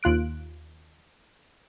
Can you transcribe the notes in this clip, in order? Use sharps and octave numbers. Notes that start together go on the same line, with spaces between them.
D#2 F4 F#6 D7